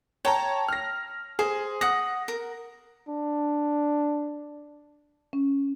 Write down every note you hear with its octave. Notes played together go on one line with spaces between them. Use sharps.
C#5 G5 A5 A#5
F6 A#6
G#4 C5
F#5 D#6 A#6
A#4
D4
C#4